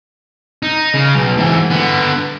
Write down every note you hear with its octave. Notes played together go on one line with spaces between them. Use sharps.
D#4
C#3
B1
G#2 E3
D3 B3